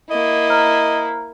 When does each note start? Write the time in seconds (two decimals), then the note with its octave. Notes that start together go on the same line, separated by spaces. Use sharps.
0.10 A#3 E4 D#5
0.48 C5 A#5 F6